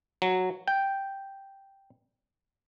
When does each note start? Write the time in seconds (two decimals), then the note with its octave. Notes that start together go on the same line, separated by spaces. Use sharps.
0.22 F#3
0.68 G5